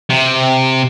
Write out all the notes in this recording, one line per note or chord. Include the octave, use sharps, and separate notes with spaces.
C3